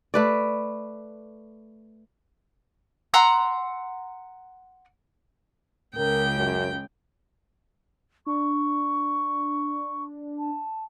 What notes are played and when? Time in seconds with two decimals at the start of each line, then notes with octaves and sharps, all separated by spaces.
0.14 A3 B4 D5
3.14 F#5 A#5 C6 E6
5.96 C#2 A#4 G5
6.36 F#2
8.26 D4 C#6
10.38 A5